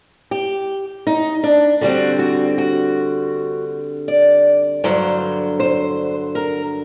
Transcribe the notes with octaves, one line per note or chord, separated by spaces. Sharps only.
G4
D#4
D4
D3 G3 C4 F#4
F#4
F#4
D5
G2 D3 F#3 C5
C5
A#4